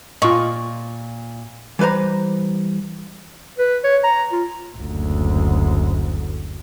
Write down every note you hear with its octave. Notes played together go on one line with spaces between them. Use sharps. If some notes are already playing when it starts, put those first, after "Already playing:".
A#2 F4 D#5 C#6
E3 G3 B4 C5 A#5
B4
C#5
A#5
F4
F#1 D2